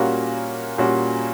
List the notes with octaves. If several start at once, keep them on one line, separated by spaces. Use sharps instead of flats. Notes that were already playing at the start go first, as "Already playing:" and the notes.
Already playing: A#2 G3 A#3 C#4 F#4
A#2 G3 A#3 C#4 F#4